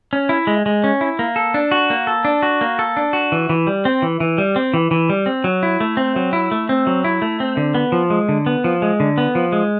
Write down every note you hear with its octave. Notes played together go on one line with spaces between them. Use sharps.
C#4
E4
G#3
G#3
C#4
E4
A#3
A4
D4
F#4
A#3
A4
D4
F#4
A#3
A4
D4
F#4
E3
E3
G3
C4
E3
E3
G3
C4
E3
E3
G3
C4
F#3
E4
A3
C4
F#3
E4
A3
C4
F#3
E4
A3
C4
D3
B3
F3
G#3
D3
B3
F3
G#3
D3
B3
F3
G#3